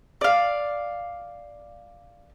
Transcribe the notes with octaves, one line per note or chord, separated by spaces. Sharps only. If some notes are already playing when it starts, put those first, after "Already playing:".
D5 F5